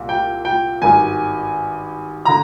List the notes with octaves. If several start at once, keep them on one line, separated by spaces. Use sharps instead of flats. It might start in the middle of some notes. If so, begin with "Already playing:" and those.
Already playing: C2 A#2
G5
G5
G#1 G2 D#3 G#5
D3 A#5